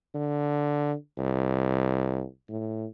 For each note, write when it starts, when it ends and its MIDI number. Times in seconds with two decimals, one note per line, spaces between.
0.14 0.94 50
1.18 2.23 36
2.49 2.86 45